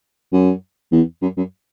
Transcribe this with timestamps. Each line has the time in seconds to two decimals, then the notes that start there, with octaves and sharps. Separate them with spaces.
0.33 F#2
0.92 E2
1.22 F#2
1.37 F#2